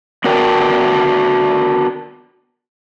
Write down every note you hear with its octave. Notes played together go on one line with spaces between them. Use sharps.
B3 D4 F#4 A#4 D5 G5